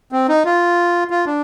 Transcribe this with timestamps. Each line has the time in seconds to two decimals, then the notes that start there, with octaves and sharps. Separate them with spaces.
0.12 C4
0.29 D#4
0.45 F4
1.10 F4
1.26 D4